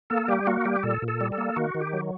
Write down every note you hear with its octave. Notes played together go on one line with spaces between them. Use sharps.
A#3 A4
G3 G4
A#3 F#4
G3 G4
A#2 A4
A#2
A4
G3
A4
A#3
D#3 F#4
D#3
G4
F#3